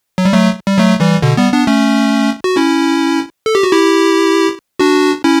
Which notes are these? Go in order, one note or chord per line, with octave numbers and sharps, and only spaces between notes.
F#3
G3
F#3 A3
G3
F#3 A3
E3 G3
B2 D3
G3 B3
B3 D4
A3 C#4
F#4
C#4 E4
A4
G4
F#4
E4 G4
D4 F#4
C#4 E4